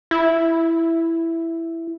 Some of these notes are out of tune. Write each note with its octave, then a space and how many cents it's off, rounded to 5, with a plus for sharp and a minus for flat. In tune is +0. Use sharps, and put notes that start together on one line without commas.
E4 +5